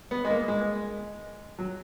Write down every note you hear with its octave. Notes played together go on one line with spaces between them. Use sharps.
B3
G#3
A#3
G#3
F#3